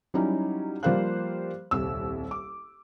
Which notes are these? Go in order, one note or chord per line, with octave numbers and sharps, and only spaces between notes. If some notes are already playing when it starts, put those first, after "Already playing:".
F#3 G3 C#4 D#4 E4
F3 G3 A#3 C5 F5 F#6
D#1 C2 E6
D6